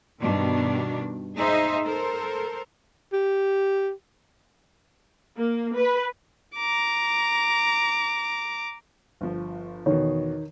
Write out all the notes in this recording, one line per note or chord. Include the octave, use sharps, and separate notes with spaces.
G2 B2 D#3 D4
D#4 G#4 C5 D#5 E5
A4 A#4 C5
G4
A#3
B4
A#5 D6
G1 F3
E2 B2 D#3 C#5